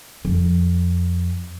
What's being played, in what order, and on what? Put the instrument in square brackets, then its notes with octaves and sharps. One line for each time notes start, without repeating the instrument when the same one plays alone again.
[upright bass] F2